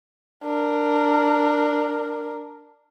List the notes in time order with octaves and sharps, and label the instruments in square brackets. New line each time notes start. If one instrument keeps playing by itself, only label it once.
[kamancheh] D4 A#4